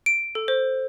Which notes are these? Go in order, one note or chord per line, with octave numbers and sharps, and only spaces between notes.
D7
A4
C5